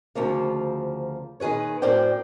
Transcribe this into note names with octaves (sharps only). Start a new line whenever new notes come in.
D2 C#3 F3 A#3
A#2 D#3 G#4 B4 C#5
F#2 A2 A#4 C5 D5 G5